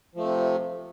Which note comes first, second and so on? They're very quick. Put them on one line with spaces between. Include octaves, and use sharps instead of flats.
F3 A3 C3